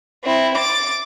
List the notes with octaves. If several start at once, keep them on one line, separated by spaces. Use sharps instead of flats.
C4 E4
D6 A6